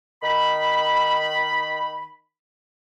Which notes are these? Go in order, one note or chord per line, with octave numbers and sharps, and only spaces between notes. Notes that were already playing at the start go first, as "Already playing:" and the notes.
D#3 B5